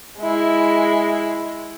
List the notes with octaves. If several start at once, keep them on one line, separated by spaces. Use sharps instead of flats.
G#3 E4